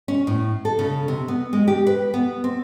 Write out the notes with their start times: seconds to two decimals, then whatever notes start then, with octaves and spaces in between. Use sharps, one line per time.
0.08 C#4
0.27 A2
0.65 A4
0.79 C#3
1.08 C3
1.28 B3
1.53 G#3
1.68 G4
1.87 B4
2.14 B3
2.44 C4